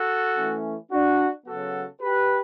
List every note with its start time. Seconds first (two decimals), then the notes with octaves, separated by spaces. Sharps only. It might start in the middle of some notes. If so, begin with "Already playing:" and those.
Already playing: F#4 A4
0.35 E3 A3 C#4
0.90 D4 F#4
1.46 C#3 F#3 B3 F#4 A4
2.01 G4 B4